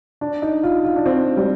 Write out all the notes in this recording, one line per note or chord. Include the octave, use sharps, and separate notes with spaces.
D4
D#4
F4
F4
D4
C4
G3